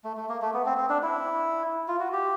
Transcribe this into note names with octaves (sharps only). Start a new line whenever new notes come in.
A3
A3
A#3
A3
B3
C4
C4
D4
E4
F4
F#4
G4